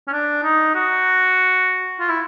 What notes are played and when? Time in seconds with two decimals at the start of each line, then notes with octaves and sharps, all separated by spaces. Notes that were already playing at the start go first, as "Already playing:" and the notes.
0.08 C#4
0.13 D4
0.43 D#4
0.75 F#4
2.00 F4
2.09 E4